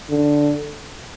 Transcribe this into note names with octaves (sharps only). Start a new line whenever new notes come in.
D3